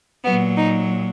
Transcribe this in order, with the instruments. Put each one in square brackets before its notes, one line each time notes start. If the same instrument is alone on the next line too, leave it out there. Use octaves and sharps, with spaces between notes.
[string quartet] A#2 F#3 B3
D#4